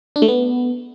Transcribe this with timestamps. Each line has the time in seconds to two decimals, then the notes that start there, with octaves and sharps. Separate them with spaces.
0.16 D4
0.22 A3
0.28 B3